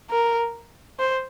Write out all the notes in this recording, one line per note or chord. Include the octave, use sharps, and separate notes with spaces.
A#4
C5